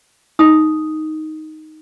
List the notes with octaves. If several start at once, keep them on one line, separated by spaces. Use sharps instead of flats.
D#4 D#6